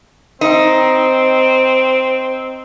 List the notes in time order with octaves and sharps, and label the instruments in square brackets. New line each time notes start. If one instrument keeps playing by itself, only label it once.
[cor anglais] C4 [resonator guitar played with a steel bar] D#4